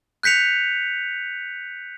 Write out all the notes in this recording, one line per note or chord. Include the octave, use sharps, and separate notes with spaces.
F#6 G6 B6 C#7 F7